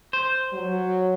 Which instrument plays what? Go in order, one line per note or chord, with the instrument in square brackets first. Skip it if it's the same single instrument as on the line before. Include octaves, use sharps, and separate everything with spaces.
[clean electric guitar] C5
[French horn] F#3